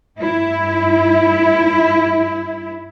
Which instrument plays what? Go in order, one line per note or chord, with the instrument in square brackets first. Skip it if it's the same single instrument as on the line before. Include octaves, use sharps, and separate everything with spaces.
[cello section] G2 E4